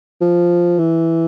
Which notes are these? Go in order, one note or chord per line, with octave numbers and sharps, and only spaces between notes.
F3
E3